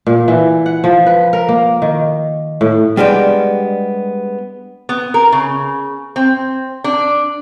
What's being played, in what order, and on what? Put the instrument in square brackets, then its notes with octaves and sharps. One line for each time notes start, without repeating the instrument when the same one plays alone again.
[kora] A#2
E3
F#5
F3
B4
A#4
A#3
D#3
A2
[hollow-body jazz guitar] G3 G#3 B3 D4 G4
[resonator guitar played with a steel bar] B3
A#4
C#3
C4
D4